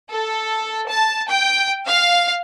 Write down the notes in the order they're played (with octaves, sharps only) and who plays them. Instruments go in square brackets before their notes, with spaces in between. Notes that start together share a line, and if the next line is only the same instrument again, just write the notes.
[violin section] A4
A5
G5
F5